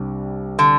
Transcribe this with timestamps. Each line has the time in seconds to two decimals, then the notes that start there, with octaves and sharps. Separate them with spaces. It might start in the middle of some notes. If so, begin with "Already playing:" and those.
Already playing: C2 C3 G3 D4 G4
0.59 D3